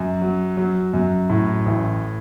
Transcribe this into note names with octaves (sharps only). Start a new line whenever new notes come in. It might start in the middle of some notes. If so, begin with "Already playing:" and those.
Already playing: F#2
F#3
F#3
F#2
A2
A1